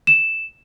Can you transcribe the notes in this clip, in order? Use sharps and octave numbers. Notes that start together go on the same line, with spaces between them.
E7